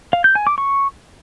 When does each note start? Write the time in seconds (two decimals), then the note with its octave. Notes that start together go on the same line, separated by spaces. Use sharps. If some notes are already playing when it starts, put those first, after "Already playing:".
0.13 F5
0.24 G6
0.35 G#5
0.47 D6
0.58 C#6